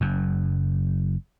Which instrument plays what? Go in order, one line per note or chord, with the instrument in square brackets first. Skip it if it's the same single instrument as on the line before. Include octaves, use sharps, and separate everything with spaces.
[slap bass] F#1 F#2